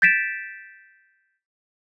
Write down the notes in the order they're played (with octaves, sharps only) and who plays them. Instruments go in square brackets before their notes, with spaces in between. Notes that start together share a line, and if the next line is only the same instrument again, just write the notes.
[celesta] G6 A6 B6 D7 E7